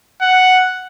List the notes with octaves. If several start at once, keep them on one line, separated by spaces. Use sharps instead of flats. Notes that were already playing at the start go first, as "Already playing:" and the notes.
F#5